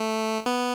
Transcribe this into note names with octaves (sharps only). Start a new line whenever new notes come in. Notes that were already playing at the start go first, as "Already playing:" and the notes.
Already playing: A3
B3